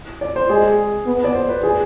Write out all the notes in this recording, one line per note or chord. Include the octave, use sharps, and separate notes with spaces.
D5
C5
G#3 G#4
B3
D5
C5
B4
G#4